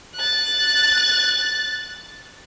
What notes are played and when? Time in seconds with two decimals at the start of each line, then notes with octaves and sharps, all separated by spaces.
0.16 F#6 A6